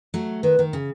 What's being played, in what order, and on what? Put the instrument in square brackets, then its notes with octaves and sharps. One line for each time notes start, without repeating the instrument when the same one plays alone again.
[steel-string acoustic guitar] F#3 A3
[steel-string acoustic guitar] D#3 [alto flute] B4
[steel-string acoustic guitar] D#3
C#3